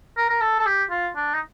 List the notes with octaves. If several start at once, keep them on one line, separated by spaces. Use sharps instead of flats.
A#4
A#4
A4
A4
G4
F4
D4
D#4